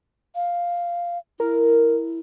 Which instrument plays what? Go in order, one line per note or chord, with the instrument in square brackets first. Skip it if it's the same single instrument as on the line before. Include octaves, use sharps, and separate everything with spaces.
[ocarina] F5
[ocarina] E4 [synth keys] A#4